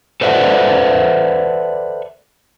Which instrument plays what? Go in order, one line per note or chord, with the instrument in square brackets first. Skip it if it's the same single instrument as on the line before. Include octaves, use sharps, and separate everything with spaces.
[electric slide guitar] A4 B4 C5 D5 E5 F#5